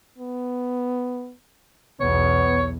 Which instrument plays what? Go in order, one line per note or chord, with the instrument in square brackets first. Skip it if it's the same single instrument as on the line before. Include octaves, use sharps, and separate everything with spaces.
[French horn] B3
[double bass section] B1 E2 [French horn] B3 [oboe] C#5